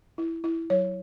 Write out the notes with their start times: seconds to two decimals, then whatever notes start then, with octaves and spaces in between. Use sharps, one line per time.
0.18 E4
0.44 E4
0.70 F#3 C#5